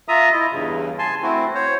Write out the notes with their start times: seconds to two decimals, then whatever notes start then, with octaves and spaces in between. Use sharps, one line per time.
0.08 F4 E5 A#5 D#6
0.32 E4 D#5
0.52 E2 G2 C#3
0.98 G#5 A5 C6
1.22 A3 C4 E4 F#4
1.55 C5 C#5